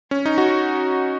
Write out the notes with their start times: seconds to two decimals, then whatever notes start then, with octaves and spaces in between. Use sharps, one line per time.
0.11 C#4
0.26 D#4
0.38 F#4